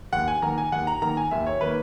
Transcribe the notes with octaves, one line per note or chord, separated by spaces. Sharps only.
D#2 F#5
G#5
D#3 A#3 A#5
G#5
D#2 F#5
A#5
D#3 A#3 A#5
G#5
D#2 E5
C#5
D#3 A#3 B4